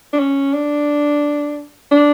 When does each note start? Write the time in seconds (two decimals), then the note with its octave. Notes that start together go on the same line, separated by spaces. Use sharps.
0.13 D4
0.19 C#4
0.54 D4
1.91 D4